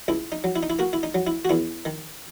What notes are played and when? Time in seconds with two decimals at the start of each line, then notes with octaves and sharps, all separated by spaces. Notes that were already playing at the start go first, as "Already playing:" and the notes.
0.08 C#2 E4
0.32 D#4
0.44 F#3
0.56 E4
0.63 D#4
0.70 E4
0.79 A#3 F#4
0.93 E4
1.03 D#4
1.15 F#3
1.27 E4
1.45 F#4
1.49 E2 E4
1.85 D#3